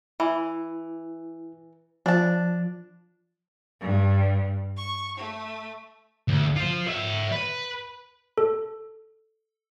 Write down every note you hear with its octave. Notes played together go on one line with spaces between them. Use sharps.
E3 E4
F3 D4 A5
G2
C#6
A3
D2
F4 C5
C#5 E5
B4
A4